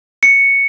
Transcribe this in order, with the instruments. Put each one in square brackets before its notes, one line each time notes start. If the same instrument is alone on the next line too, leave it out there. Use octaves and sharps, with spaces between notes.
[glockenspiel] C#7